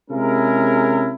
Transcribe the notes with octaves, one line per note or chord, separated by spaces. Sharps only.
C3 G#3 C#4 E4 G#4 A#4